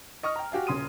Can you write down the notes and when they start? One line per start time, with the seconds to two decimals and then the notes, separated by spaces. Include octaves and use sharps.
0.23 D#5 C#6 D#6 F6
0.36 G5 A#5
0.52 F#4 G4 F5 G#5
0.67 D#1 C#3 C6 D#6 D#7